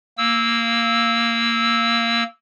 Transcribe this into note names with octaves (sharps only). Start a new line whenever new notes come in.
A#3 E6